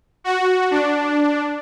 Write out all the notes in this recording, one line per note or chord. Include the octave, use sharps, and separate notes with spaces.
F#4
D4